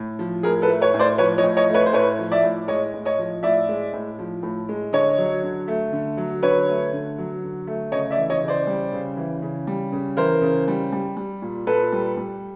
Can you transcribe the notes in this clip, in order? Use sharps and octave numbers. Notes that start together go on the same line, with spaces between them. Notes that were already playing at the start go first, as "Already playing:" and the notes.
Already playing: A2
F3
A2 G#4 A#4
A4 B4
A3
B4 C#5
A2
C5 D5
F3 B4 C#5
C#5 D#5
A2
C#5 D#5
A3
B4 C#5
C5
A2 B4 C#5
F3
D5 E5
A2
G#3 C#5 D#5
A2
C#5 D#5
F3
A2 D5 E5
G#3
A2
F3
A2
G#3
D3 C#5 D#5
F#3
D3
A3
D3
F#3
D3 B4 C#5
A3
D3
F#3
D3
A3
C#3 C#5 D#5
D5 E5
E3
C#5 D#5
C#3
C5 D5
G3
C#3
E3
C#3
G3
C#3
E3 A#4 C5
C#3
G3
G3
G3
A#2
A#2 A4 B4
G3
G3